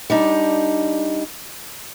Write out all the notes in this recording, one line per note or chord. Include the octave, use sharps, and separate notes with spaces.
G3 D4 D#4